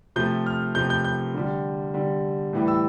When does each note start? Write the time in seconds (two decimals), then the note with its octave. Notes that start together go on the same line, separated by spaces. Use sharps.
0.16 C3 F3 A3 G6
0.46 F6
0.75 C3 F3 A3 G6
0.90 G6
1.04 G6
1.34 D3 G3
1.94 D3 G3
2.53 A2 E3 G3
2.68 E6